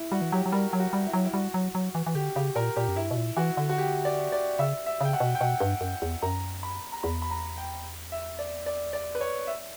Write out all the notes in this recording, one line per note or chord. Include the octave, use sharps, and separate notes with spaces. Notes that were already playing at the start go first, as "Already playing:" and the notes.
Already playing: E4
G3 F#4
E3
F#3 G4
F#3
G3 A#4
F#3
F#4
G3
E4
F#3
E4
G3 F#4
F#3
F#3
E3
E3
D3 G4
C#3 G4
A#2 A#4
A#2 G4
F#2
G2 E4
B2
A#2
E3 F#4
D3
F#4
G4
D5
D5
C#3 E5
E5
C#3 G5
F#5
B2
G5
B2 F#5
G2
F#2
E2
F#2 A#5
B5
A#5
E2 B5
B5
A#5
G5
E5
D5
D5
D5
B4
C#5
E5